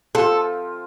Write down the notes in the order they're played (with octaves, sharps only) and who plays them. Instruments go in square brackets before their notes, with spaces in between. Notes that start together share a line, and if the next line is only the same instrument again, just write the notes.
[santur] F3 C4 F4 [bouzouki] A4